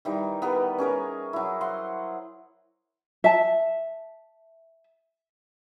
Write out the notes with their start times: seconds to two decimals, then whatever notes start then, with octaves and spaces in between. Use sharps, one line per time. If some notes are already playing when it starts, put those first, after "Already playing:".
0.05 D#3 E3 G3 D#4
0.42 B3 G4 A#4 B4
0.78 C#4 G#4 A#4 C#5
1.33 F#3 E4
1.61 C5 F#5 C6
3.24 E5 A5